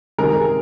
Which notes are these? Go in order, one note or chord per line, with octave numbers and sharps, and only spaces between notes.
C3 D#3 G#3 A#4
G#4